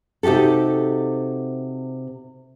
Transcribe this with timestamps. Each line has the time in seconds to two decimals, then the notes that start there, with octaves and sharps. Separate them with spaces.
0.23 C3 D#4 F#4 G4 A4